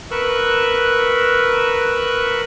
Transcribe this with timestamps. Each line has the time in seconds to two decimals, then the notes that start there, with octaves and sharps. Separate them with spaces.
0.11 A#4 B4 C#6 E6 F#6